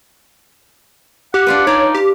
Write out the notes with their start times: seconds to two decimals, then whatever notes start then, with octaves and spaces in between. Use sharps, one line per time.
1.34 G4 F#5
1.47 D4 F4 B4
1.67 D#4 C#5 D5
1.95 G4